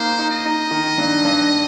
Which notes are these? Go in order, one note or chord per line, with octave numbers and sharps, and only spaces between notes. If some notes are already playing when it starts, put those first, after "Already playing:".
Already playing: A#3 D#4 C5
D#4
D#5
D#4
D#3
G2
G2